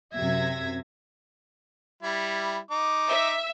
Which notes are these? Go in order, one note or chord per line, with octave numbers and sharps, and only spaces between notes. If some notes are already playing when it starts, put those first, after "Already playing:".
F#2 C3 E5 G#6 A#6
G3 E4
D#4 D6
E5